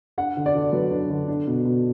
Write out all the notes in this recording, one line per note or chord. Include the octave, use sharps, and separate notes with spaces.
D4 F#5
D3
D5
D3
F#3 B4
D4
D3
D4
B2
B2